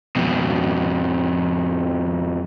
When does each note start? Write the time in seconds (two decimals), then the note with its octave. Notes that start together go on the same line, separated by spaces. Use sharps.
0.16 F2 B2